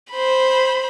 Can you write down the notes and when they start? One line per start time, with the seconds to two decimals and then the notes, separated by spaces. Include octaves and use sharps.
0.11 C5 B5